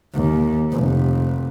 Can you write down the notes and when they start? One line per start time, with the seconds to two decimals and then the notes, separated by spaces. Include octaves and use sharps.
0.14 D#2
0.73 F1